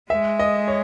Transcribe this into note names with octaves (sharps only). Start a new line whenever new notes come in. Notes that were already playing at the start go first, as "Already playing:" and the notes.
G#3 E5
D#5
C#5